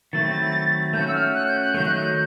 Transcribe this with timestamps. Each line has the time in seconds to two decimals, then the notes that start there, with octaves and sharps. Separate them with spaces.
0.13 D#3 F#3 A3 C4 E4 A6
0.93 A3 C#4 F#4 G6
1.08 E6
1.14 F6
1.34 F#6
1.48 G6
1.61 F#6
1.74 D#3 F#3 A3 G6
1.85 F#6
1.95 G6